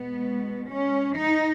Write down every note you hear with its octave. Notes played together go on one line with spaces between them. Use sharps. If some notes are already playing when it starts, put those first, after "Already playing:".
Already playing: B2 G#3 B3
C#4
D#4